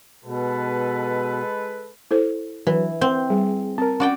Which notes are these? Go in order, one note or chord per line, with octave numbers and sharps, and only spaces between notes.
B2 G#3 A4 B4
E4 A4 C5
E3 F#3
C4 G6
G3 G#4
C4 A#4 A5
C#4 F#4 D5 G5